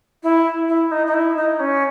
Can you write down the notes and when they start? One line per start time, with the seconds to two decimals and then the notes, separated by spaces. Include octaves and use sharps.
0.23 E4
0.68 E4
0.91 D#4
1.06 D#4
1.13 E4
1.36 D#4
1.59 C#4